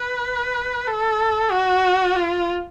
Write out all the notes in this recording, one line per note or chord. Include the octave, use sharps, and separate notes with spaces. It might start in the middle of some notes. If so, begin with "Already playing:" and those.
Already playing: B4
A4
F#4
F4